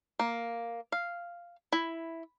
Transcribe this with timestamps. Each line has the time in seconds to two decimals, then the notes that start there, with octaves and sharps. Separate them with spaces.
0.19 A#3
0.92 F5
1.72 E4